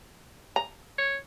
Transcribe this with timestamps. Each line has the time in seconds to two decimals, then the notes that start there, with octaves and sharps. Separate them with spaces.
0.56 A#5
0.98 C#5